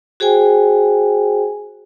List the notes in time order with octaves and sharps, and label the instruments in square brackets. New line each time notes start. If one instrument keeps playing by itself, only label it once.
[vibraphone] F#4 G#4 C5 G5 G#5